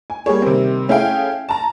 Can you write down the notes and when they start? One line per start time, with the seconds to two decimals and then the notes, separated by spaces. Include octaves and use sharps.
0.10 G#5
0.26 G3 A#3 G#4 C#5
0.42 C3 D#3 G3 A#3 C4
0.89 A3 C#4 E4 G#4 F5 G5
1.49 A5 A#5